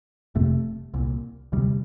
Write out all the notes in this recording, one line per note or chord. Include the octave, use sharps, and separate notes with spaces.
F1 F2 C3 A3
C2 A#2
E1 D2 C3 G3